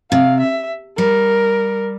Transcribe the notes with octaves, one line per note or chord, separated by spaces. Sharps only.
C3 F5
E5
G3 A#4